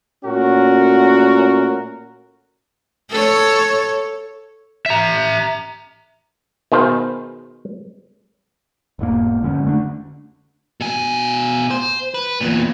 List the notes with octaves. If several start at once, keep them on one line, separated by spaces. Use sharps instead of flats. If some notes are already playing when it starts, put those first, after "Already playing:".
A#2 A3 C#4 F#4 A#4
A4 C#5
E5 A#5
B2 D#3 G#4 C5
E1 G#2 A#3
F2 D3 G#3 C#4
D3 A3 D4
B2 G#5
C5
B4
E2 A#2